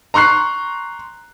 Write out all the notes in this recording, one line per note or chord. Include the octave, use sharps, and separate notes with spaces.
A#5 C6 C#6 F#6 C7